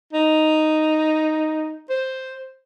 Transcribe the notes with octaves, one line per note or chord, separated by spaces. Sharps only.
D#4
C5